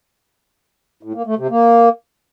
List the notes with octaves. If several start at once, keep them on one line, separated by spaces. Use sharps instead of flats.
A2
A#3
A3
C3
A#3